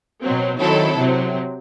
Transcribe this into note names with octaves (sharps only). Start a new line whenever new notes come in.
B2 F#3 C4
D#3 F#3 C4 E4 A4
C3 F#3 C4